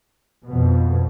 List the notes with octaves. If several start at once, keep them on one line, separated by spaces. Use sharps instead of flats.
F2 B2